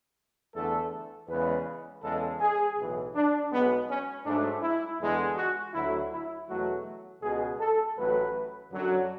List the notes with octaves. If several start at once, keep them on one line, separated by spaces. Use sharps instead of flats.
E2 D3 A3 A4
E2 C#3 G#3 B4
E2 C#3 G#3 A4
G#4
B1 A2 E3
D4
B1 B2 G#3 B3
C#4
G#2 F#3 A3 D4
E4
E2 D3 G#3
F#4
D2 D3 F#3 A3 E4
E4
E2 B2 F#3 A3 F#4
C#2 B2 G#3 G#4
A4
A1 A2 F#3 B4
F#2 D3 F#3